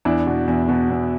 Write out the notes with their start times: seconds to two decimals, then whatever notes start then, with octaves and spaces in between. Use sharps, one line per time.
0.05 E2 D4 E4
0.27 B2
0.48 E2
0.69 B2
0.90 E2